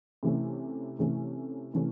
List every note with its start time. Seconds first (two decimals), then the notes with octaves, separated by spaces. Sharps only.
0.23 C3 E3 A3 C#4
0.99 C3 E3 A3 C#4
1.74 C3 E3 A3 C#4